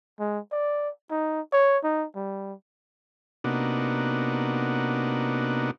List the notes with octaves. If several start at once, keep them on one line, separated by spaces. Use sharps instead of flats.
G#3
D5
D#4
C#5
D#4
G3
C3 A#3 B3 D4 D#4 F#4